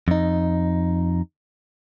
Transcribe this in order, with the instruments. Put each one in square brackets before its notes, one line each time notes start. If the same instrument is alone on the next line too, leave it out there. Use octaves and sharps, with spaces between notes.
[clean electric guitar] F2 D#4